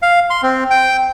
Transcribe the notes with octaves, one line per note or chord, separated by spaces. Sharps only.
F5
C6
C4
G5